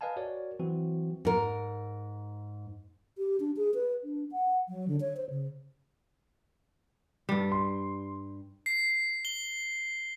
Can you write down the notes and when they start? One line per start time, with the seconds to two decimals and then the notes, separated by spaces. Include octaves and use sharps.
0.01 B4 D#5 F5 G#5 A5
0.16 F#4 A#4 C#5 D5
0.59 E3 F#3 C4 F#4
1.25 G#2 A#4
3.18 G4
3.40 D4
3.57 G#4
3.74 B4
4.04 D4
4.32 F#5
4.69 F#3
4.88 D3
5.01 C#5
5.17 C5
5.30 C#3
7.29 G2 G3
7.52 C6
8.66 C7
9.25 G7